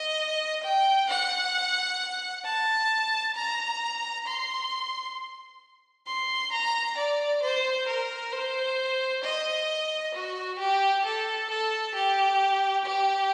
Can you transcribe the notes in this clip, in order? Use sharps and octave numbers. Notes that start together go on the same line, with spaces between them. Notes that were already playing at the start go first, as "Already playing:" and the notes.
Already playing: D#5
G5
F#5
A5
A#5
C6
C6
A#5
D5
C5
A#4
C5
D#5
F#4
G4
A4
A4
G4
G4